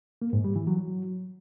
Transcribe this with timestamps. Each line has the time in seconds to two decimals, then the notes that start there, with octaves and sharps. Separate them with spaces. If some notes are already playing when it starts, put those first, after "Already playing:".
0.22 A#3
0.33 G#2
0.44 G3
0.56 E3
0.67 F#3